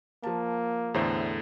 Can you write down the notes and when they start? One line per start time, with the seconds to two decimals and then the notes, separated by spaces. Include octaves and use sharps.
0.23 F3 A#3 A5
0.94 E2 A2 D3 A4 C5 E5